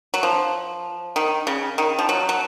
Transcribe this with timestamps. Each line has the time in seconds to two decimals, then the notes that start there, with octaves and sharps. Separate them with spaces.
0.14 F#3
0.23 F3
1.16 D#3
1.47 C#3
1.78 D#3
1.99 F3
2.09 F#3
2.29 F#3